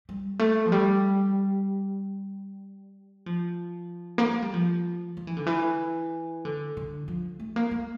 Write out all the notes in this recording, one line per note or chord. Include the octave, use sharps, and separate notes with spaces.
G3
A3
F3
G3
F3
A#3
A3
G3
F3
F3
E3
D3
E3
D3
D3
F3
A3
A#3
A#3